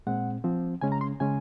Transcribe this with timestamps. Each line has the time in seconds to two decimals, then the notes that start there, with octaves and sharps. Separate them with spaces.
0.07 A#2 G#3 C4 F#5
0.44 F3 C4
0.81 C#3 G#3 C#4 G#5
0.92 A#5
1.01 C6
1.20 C#3 G#3 C#4 G#5